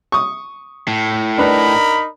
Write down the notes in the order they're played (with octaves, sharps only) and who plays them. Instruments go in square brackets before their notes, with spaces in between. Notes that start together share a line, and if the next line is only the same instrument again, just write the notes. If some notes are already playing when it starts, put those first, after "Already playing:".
[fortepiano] C#6 D#6
[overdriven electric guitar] A2
[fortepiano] D4 B4 A#5 [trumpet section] D#4 A#4 B5